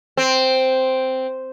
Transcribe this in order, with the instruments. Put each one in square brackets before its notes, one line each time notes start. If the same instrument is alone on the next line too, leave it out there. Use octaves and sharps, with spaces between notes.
[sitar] C4